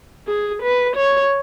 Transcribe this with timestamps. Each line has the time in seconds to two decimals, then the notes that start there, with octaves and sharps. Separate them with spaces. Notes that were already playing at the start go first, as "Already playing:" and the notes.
0.27 G#4
0.63 B4
0.97 C#5